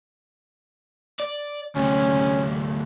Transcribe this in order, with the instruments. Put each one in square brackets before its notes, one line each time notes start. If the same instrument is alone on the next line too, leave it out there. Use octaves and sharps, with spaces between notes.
[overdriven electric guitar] D5
[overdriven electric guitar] D2 C3 [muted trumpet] C#4